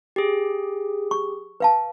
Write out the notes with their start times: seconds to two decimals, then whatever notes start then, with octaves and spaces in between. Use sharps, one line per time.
0.16 G4 G#4
1.11 C#6
1.60 B4 F5 A5